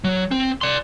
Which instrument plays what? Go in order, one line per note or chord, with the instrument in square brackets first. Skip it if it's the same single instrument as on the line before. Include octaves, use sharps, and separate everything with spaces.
[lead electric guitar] F#3
C4
D5 C6